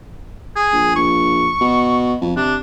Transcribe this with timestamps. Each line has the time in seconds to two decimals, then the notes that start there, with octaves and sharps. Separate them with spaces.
0.56 G#4
0.72 A#1
0.96 A#1 C#6
1.60 B2
2.21 F2
2.37 C3 D4